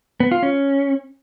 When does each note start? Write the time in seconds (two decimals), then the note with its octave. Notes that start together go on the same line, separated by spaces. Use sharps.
0.20 B3
0.32 F4
0.43 C#4